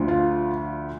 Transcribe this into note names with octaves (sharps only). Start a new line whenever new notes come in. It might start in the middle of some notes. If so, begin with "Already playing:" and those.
Already playing: D2 D3 F3
F4